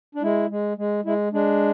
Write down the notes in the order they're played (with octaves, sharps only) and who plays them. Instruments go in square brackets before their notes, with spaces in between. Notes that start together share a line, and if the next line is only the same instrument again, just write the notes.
[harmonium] D4
G#3 E4
G#3
G#3
G#3 E4
G#3 D4